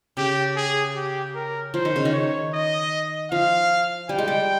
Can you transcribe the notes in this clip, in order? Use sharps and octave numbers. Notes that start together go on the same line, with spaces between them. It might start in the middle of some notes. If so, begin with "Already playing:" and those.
C#3 G4
G#4
G4
A#4
F3 C5
D#3
C#3
D#3
C#5
D#5
F3 F5
G3 G5
G#3
G3